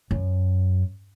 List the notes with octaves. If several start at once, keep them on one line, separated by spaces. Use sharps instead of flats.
F#2